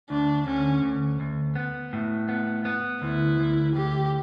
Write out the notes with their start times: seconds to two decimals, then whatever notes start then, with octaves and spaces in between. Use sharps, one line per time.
0.10 D2 D4
0.47 D2 C#4
0.83 D2
1.20 D2
1.55 B3
1.93 A2
2.29 B3
2.65 B3
3.02 D2 E4
3.39 D2
3.75 D2 G4